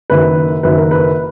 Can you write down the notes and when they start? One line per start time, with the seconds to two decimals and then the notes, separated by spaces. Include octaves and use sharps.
0.10 F#1 F#2 D#3 B4
0.63 F#1 F#2 D#3 B4
0.78 A#4
0.91 B4